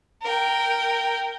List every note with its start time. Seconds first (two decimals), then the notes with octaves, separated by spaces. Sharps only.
0.22 A#4 G5